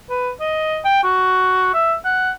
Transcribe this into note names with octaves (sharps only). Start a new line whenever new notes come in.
B4
D#5
G5
F#4
E5
F#5